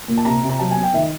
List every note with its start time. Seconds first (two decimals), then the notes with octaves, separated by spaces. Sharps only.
0.08 A#2
0.17 A5
0.25 C3 A#5
0.43 C3
0.49 A#5
0.59 F#3 A5
0.71 G#5
0.76 B3
0.83 G5
0.93 D#3 E5
1.02 D#5